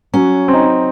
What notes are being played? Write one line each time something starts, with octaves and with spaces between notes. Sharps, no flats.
F#3 C#4
C4
D#4